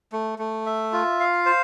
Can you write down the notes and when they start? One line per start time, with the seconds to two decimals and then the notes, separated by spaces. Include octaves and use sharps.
0.12 A3
0.39 A3
0.66 E5
0.93 F4
1.20 F5
1.46 C5